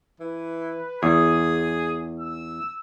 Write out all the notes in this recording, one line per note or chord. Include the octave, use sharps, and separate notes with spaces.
E3 B4
E2 G#4 D#6
E6